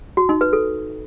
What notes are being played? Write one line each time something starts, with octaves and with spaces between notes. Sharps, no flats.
F#4
D#4
B4
A4